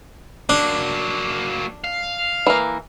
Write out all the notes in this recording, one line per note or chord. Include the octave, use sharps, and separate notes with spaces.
F#3 A#3 D4
F5
E3 A#3